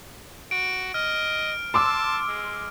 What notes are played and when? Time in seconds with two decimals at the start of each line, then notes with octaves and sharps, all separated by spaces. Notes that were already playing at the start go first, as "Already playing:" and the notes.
0.51 F#4 D7
0.94 D#5 F6
1.74 A5 C6 D6 E6
2.28 G#3